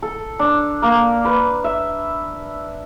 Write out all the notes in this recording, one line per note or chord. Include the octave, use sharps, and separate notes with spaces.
A4
D4
A#3
B4
E5